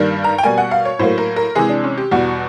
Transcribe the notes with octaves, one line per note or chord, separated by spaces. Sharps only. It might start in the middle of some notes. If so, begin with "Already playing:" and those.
Already playing: G2 D#3 G3 A#3
A#5
G5
B2 G3 A#3 G#5
F#5
F5
C#5
A2 F#3 A#3 C5
A#4
A#4
C3 E3 G#3 G#4
D4
C#4
G4
E2 B2 G3 F#4